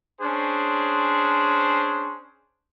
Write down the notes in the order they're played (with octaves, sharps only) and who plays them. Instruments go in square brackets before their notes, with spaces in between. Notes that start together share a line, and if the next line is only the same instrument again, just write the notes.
[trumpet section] C#4 D4 G#4 C5